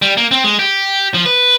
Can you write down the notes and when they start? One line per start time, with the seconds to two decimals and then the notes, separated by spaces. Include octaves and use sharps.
0.02 G3
0.17 A#3
0.31 C4
0.44 G#3
0.59 G4
1.14 F3
1.26 B4